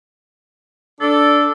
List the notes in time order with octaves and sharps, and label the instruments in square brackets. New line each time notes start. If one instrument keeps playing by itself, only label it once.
[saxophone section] D4 [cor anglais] A4